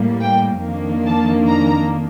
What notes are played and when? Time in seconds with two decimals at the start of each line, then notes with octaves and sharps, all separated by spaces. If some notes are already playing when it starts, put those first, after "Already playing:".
Already playing: A2 G3 A#3
0.21 G5
0.63 F2 D#3 A#3 D4
1.06 A5
1.48 A#5